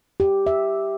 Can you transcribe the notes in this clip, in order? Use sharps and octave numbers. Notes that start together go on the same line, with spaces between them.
G4
E5